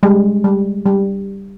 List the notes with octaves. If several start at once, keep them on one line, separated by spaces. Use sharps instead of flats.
G3 G#3
G3
G3